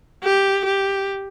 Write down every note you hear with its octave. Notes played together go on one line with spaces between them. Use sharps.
G4
G4